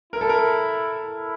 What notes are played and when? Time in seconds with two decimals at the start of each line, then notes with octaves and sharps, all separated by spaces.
0.13 E4 A#4
0.21 A4
0.29 A#4
1.05 E4